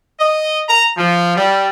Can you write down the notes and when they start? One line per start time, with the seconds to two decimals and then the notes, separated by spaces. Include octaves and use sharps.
0.19 D#5
0.68 A#5
0.96 F3
1.36 G3